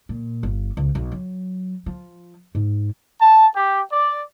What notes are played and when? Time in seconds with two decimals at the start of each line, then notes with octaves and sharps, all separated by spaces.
0.09 A#2
0.43 G1
0.77 C#2
0.95 B1
1.12 F#3
1.86 F3
2.55 G#2
3.21 A5
3.54 G4
3.92 D5